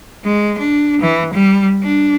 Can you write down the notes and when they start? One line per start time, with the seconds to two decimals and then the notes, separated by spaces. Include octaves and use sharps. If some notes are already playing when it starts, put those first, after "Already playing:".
0.24 G#3
0.58 D4
1.01 E3
1.34 G3
1.83 D4